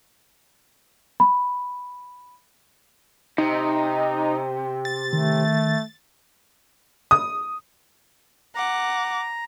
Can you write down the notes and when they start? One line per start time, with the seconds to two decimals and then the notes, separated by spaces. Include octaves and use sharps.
1.20 B5
3.38 C3 D#4
4.85 A6
5.13 D#3 A3
7.11 D#6
8.55 F#5 A#5 D6